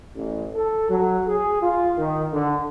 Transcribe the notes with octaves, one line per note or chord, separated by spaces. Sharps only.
A1
A4
F#3
G#4
F4
D#3
D3